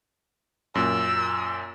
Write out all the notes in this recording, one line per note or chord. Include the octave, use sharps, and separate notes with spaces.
F#2 A#2 E6